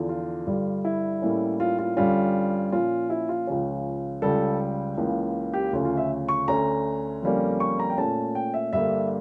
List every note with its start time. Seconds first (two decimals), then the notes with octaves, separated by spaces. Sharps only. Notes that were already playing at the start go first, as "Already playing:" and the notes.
Already playing: E2 D3 F3
0.09 F4
0.47 G2 D3 G3
0.85 E4
1.22 A2 G3 A#3 C#4
1.60 F4
1.79 F4
1.97 G2 D3 G3 C#4 F4
2.72 A#2 F3 C#4 F4
3.10 E4
3.29 F4
3.47 C#2 C#3 F3 C#4
4.22 C#2 C#3 G3 A4
4.97 C#2 C#3 E3 A#3
5.53 G4
5.73 D2 C#3 F3 A3 C#4
5.85 F4
5.98 E5
6.29 C#6
6.48 D2 D3 A3 C#4 A#5
7.23 F2 D3 G3 A#3 C#4
7.60 C#6
7.79 A#5
7.90 G5
7.98 A#2 A3 C#4 A5
8.35 G5
8.54 E5
8.73 G2 D3 G3 A#3 E5